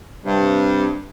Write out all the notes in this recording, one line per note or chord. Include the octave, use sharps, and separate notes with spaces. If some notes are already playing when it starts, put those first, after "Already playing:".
G2 C3 G3